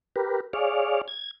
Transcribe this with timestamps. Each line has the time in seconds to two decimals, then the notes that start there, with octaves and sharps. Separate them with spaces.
0.16 G4 A#4 B4
0.53 G#4 C#5 D5 F5
1.08 G#6